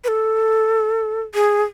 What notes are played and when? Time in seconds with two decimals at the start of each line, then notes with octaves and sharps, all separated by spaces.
0.04 B4
0.08 A4
1.34 G#4